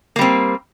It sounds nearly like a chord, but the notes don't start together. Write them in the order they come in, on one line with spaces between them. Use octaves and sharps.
A#3 G3 C4